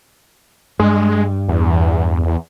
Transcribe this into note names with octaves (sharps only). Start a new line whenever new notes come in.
G2 G#3
E2